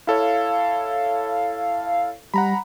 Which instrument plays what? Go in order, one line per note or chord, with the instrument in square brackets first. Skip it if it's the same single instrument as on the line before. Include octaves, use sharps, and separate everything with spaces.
[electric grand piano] E4 A4 C#5 [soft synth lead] F5
[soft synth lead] G3 [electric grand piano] F#5 A#5 B5